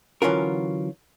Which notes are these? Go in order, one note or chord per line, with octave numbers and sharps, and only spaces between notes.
D3 E3 F#3 C#4 F4 A#4